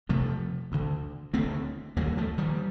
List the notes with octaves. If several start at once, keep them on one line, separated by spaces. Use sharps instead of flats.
F2 C3 F3 A3
D2 D3
D2 D3 A3 C4
D#2 D3 G3 A#3
F3 A3
D#3 G3